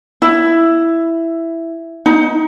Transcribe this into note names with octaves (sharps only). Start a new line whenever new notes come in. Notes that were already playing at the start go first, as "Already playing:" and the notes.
E4
D#4